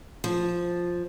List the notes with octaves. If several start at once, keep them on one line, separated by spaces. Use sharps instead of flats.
F3